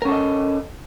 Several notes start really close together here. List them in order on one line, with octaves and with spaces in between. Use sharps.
A#4 C#4 A4 D#5